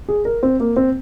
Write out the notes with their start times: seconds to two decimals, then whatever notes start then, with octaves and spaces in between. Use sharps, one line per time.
0.09 G#4
0.25 A#4
0.43 C4
0.60 A#3
0.76 C4